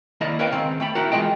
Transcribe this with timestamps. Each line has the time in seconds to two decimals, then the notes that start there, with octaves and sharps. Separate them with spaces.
0.21 D#3 A#3 E4 D5 D#5 A#5
0.39 A#4 B4 C#5 D#5 F5 G5
0.52 C#2 D#3 C4
0.80 A3 G5 B5
0.95 D#4 E4 F#4 A#4
1.12 E3 G#3 C4 F4 D#5 G5